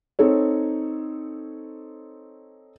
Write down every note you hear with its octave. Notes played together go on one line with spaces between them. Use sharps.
C4 D#4 A4 C#5